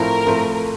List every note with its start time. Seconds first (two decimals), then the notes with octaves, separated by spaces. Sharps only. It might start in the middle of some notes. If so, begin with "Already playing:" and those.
Already playing: A2 F3 A3 C4 A#4
0.26 A2 F3 A3 C4